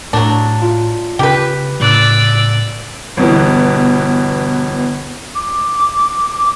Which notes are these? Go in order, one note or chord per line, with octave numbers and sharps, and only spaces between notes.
A2 F#3 D4
F4
C#3 G4 B4
A2 C#3 D5 E6 F#6
G1 B2 E3
D6